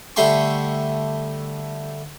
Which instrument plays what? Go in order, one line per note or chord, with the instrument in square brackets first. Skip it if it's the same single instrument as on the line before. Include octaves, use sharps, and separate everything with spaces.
[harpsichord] D3 G3 A3 G5 C6 C#6